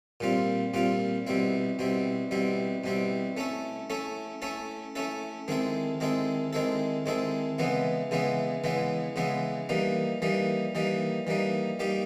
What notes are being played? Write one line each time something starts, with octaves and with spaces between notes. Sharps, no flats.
A#2 G3 C4 F4
A#2 G3 C4 F4
B2 G3 C4 E4
B2 G3 C4 E4
B2 G3 C4 E4
B2 G3 C4 E4
A3 C#4 E4 A4
A3 C#4 E4 A4
A3 C#4 E4 A4
A3 C#4 E4 A4
D#3 G#3 C4 E4 A4
D#3 G#3 C4 E4 A4
D#3 G#3 C4 E4 A4
D#3 G#3 C4 E4 A4
C#3 E3 G#3 B3 E4
C#3 E3 G#3 B3 E4
C#3 E3 G#3 B3 E4
C#3 E3 G#3 B3 E4
E3 G3 A#3 D#4
E3 G3 A#3 D#4
E3 G3 A#3 D#4
E3 G3 A#3 D#4
G3 A#3 D#4 G4